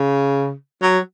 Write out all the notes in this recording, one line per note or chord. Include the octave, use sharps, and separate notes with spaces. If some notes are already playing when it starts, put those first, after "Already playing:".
Already playing: C#3
F#3